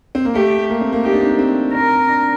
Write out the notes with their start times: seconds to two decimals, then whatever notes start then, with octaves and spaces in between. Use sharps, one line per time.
0.15 C4
0.25 A#3
0.35 A3 G4
0.70 A#3
0.81 C4
0.92 A#3
1.04 D#4 G4
1.13 D4
1.21 C4
1.29 D4
1.39 C4
1.74 C4 A#4
2.08 D4